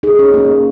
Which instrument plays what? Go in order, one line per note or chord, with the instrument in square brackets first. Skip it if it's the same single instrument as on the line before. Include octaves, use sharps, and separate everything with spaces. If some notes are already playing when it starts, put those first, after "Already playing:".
[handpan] D#4 [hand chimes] G#4
[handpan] C#4
[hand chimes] G#4
[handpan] A#3
[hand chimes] D#5